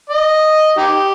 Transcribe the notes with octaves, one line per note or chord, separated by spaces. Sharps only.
D#5
D#4 G4